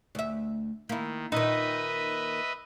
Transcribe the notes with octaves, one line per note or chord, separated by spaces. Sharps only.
D2 E5
D#3 A#3 E4
A#2 D#3 D#4 B4 D#5 E5